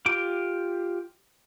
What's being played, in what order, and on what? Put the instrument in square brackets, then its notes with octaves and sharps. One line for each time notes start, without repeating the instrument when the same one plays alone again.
[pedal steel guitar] F4 G4 D6